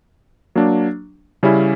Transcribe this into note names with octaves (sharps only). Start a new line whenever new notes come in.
F#3 A#3 D4
C#3 G3 C#4 E4